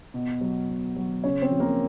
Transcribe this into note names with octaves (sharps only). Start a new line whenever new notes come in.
B2
F#3
B2
F#3
C#3 C#4 C#5
C4 C5
F3
A#3 A#4